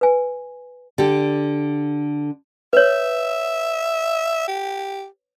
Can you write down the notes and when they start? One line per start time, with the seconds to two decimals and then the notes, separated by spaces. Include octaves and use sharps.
0.01 B4 G#5
0.98 D3 G4 A4
2.73 B4 C#5 E5
4.48 G4